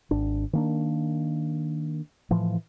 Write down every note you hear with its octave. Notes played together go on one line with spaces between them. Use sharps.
G#1 D4
D#3 A#3 D4
A2 E3 F3